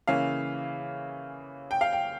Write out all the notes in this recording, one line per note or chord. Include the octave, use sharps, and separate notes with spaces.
C#3 E3 A#3 C#4 F5
G5
F5
G5